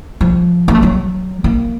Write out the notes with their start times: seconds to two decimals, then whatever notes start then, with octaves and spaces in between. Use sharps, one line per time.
0.21 F3
0.68 A#3
0.75 A3
0.82 F#3
1.44 A#3